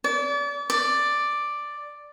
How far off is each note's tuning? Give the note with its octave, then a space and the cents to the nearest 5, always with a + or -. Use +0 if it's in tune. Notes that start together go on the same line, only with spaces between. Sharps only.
D5 -35
D5 +5